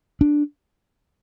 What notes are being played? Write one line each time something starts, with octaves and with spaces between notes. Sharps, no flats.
D4